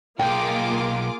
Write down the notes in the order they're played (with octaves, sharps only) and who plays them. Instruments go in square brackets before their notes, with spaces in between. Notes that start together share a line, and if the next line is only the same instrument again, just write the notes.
[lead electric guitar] B1 [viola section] A#3 [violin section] F4 G#4 D6 [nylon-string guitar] G5